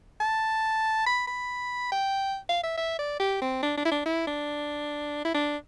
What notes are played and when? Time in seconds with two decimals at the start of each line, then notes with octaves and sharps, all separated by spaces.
0.21 A5
1.06 B5
1.27 B5
1.92 G5
2.49 F5
2.64 E5
2.78 E5
2.99 D5
3.20 G4
3.42 C4
3.63 D4
3.77 D4
3.85 E4
3.92 D4
4.06 E4
4.27 D4
5.25 E4
5.34 D4